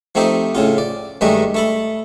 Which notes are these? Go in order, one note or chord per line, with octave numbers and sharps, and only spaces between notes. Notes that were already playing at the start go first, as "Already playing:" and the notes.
F3 A3 C4 D#4 G4
A2 C#3 F4
D5
G2 D#3 G#3 A3 D4 D#4
A3 A4 B5